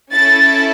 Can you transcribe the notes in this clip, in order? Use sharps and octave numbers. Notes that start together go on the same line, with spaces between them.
C#4 E4 A4 A6